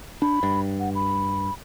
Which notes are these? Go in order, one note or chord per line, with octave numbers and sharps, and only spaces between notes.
D4 B5
G2
F#5
B5